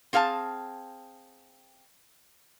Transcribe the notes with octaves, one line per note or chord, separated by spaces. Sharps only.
C4 G#4 F5 F#5 A5